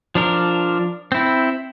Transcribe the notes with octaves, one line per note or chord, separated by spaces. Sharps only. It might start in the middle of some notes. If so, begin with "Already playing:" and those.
F3 D4 A#4
C4 E4